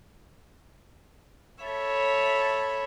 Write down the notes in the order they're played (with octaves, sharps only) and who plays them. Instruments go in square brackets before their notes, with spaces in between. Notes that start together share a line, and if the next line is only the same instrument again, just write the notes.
[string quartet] A4 C#5 E5 B5